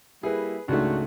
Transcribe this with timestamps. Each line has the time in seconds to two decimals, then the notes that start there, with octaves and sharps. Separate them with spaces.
0.23 G3 A#3 E4 G#4 B4
0.68 C#2 G#2 A3 D4 F#4